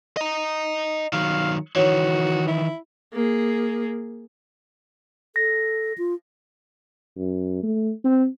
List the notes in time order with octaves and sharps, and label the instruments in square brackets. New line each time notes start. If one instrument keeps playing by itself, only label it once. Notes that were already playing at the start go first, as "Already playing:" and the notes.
[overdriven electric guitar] D#5 A#5
[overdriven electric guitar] D#3 F#3 [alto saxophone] F5
[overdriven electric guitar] D#3 E3 [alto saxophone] F#4 [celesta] C#5
[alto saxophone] E4
[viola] A#3 G#4
[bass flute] A4 [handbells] A#6
[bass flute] F4
[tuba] F#2
A3
C4